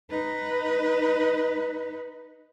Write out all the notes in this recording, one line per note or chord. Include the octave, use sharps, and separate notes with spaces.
D#4 B4